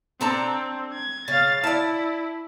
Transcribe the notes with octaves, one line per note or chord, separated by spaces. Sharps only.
C4 D4 A4 A#5
G#6
C#3 F5 A6
E4 D5 A5